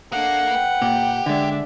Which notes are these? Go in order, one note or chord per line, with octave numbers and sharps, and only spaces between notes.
A3 A#3 D4 F#5
B4 G5
A#2 G4
D3 G#3 D4 E5